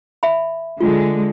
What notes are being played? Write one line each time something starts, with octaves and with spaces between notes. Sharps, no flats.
E5 B5
D3 G#3 F4